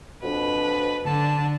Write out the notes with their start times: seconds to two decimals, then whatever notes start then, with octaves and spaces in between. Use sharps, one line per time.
0.23 F2 B2 D4 B4
1.06 D3 D4 A5